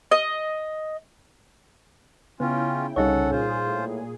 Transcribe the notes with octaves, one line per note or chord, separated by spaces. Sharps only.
D#5
C#3 B3 C#4 E4 F4 G5
C2 C#3 G3 C#4 D#4 A4 C#5 F#5
A#2 F4 G#4 C5
A2